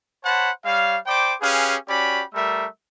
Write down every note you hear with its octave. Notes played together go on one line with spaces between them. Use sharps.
C5 C#5 F#5 A5 B5
G3 C#5 F5
C5 D5 G5 B5 D6
C#4 G4 G#4 B4 F5
C#4 F#4 G4 D5 B5
G3 A3 A#4 E5